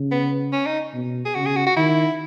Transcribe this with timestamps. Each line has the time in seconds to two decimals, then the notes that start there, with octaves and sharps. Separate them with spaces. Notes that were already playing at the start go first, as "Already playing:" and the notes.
Already playing: C#3
0.12 B3
0.53 C#4
0.66 D#4
0.94 B2
1.25 G#4
1.35 C#3 F#4
1.46 G#4
1.56 F#4
1.67 F#4
1.77 D#3 E4